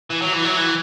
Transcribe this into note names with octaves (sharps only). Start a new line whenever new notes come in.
E3
F#3
E3
F#3
E3